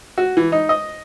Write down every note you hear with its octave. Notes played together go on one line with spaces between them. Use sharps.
F#4
E3
D#4
D#5